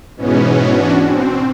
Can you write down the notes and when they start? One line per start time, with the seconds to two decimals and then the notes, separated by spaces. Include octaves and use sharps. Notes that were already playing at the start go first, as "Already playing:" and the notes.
0.17 G#2 B2 E3 B3 C#4
0.71 C#4 D4 F#4
1.04 C4